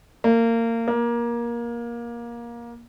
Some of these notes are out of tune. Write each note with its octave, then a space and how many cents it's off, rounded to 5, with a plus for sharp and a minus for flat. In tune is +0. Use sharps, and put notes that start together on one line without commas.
A#3 -25
A#3 +20